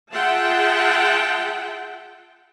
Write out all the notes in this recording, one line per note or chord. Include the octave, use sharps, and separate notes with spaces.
F4 G#4 E5 F#5 G5 A5